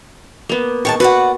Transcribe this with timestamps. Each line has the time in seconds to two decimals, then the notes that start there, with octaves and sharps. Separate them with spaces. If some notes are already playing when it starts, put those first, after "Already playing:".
0.49 A#3 B3
0.85 D#3 G#3 A5 C#6
1.00 F#4 B4 D5 F#5